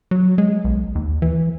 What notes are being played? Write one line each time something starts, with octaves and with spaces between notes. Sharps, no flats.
F#3
G#3
B1
D#2
E3